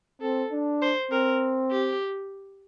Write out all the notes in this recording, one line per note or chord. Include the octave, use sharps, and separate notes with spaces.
C4 A4
D4
C5
C4 A#4
G4